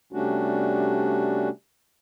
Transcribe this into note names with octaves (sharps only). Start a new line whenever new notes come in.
C3 G3 A3 C#4 D4 F#4